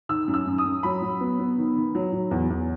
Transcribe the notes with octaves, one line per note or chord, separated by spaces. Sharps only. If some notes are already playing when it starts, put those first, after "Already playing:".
D#3 E6
F#2
E6
F#2
D#6
F#2
F#3 B5
F#3
B3
B3
D#3
D#3
F#3
F#3
E2
E2